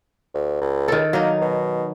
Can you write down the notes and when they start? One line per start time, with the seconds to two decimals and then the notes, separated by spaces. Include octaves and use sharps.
0.34 D2
0.61 C#2
0.88 D#3 A4
1.13 F#3 A#3 D#4
1.42 B2